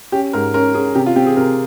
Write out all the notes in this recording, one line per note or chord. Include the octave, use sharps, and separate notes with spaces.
C#4 G4
G#2 A#4
C#4 A#4
C#4 G#4
C3 G4
F4
C4 G4
G#4
C3 A#4